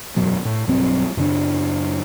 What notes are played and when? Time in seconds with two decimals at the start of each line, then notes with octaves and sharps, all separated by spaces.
0.16 E1 F#2 B2 F#3
0.45 A2
0.67 B1 G2 F#3 C4
1.17 F#2 C#3 D4